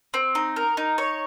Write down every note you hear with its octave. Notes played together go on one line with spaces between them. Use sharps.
C4
D#4
A#4
D#4
C#5